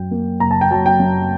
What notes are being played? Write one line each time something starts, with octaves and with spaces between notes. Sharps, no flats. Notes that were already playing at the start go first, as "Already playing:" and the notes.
Already playing: F#2 F#3 G5
A#3
F#1 A#5
A5
G5
F#3 A5
G5
F#2